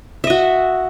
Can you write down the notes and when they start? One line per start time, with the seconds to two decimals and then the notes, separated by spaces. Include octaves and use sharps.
0.24 E5
0.27 D#5
0.30 F#4